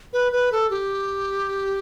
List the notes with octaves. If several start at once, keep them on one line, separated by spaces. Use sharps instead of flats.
B4
B4
A4
G4